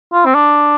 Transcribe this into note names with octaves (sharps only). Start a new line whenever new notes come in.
F4
C4
D4